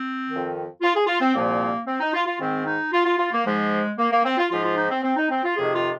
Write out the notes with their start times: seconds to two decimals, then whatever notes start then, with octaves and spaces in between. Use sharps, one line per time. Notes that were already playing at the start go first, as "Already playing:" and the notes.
Already playing: C4
0.29 F2 D#3
0.81 F4
0.94 G#4
1.07 F4
1.20 C4
1.33 C2 A#2 F3 A#3
1.86 C4
2.00 D#4
2.13 F4
2.26 F4
2.39 G#2 D#3 C4
2.65 D#4
2.92 F4
3.05 F4
3.18 F4
3.32 A#3
3.44 G#2 F3 G#3
3.98 A#3
4.11 A#3
4.24 C4
4.37 F4
4.50 G#2 F3 F4
4.63 F4
4.76 D#4
4.90 C4
5.03 C4
5.16 D#4
5.29 C4
5.43 F4
5.56 F2 C3 D#3 G#4
5.74 F4